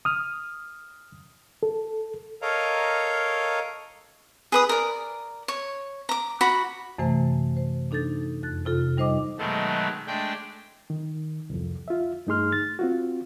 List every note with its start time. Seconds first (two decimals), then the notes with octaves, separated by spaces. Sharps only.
0.05 D#6 F6
1.63 A4
2.42 A4 A#4 C#5 D#5 F5 A#5
4.52 G#4 B4 D#6
4.69 A#4 D5
5.48 C#5
6.09 A#5 D6
6.41 F#4 B5
6.98 F#2 C3 E3 A3 C5 G#5
7.57 C5
7.91 D4 D#4 A4 G6 A6
8.43 F2 F#6 A6
8.65 C3 F4 A4
8.97 G3 D#4 C5 D#5 D6
9.38 B2 D#3 F#3 G#3 A3
10.07 G#3 A3 D4 G5
10.90 D#3
11.50 C2 F2
11.88 F4 E5
12.27 G2 A3 D#4 G#4 C6 F6
12.52 A6
12.79 C4 F4 F#4